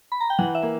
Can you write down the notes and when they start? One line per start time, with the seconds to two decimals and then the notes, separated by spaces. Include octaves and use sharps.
0.12 B5
0.20 A#5
0.30 G5
0.38 E3 F#5
0.55 E5
0.63 A#3